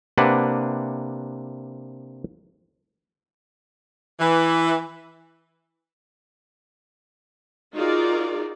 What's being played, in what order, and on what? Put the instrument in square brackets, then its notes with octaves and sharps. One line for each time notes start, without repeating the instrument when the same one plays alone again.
[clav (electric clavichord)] C3 A#3 D4 B4 F#5
[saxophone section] E3
[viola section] D#4 F4 F#4 G#4 A#4 D5